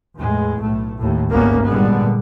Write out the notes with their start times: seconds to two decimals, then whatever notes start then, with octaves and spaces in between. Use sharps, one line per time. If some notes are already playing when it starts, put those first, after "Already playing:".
0.17 E2 A2 G#3
0.61 B1 A2 A3
0.97 D#2 A2
1.31 G#1 D2 G2 A#3 B3 C#4
1.65 A#2 D3 G3 G#3 B3